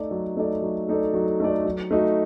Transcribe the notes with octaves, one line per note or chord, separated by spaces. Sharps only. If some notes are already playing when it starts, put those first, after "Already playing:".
Already playing: A3 D#4 A4 D5
F#3
A3 D#4 A4 D5
F#3
A3 D#4 A4 D5
F#3
A3 D#4 A4 D5
F#3
A3 D#4 F#4